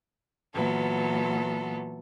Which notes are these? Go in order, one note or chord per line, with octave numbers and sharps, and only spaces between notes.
A#2 E3 F#3 B3 A4